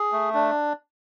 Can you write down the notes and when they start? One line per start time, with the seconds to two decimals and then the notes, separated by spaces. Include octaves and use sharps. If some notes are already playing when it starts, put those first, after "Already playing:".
Already playing: G#4
0.12 A3
0.34 D4